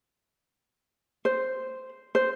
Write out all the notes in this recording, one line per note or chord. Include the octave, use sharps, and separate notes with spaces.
C5
C5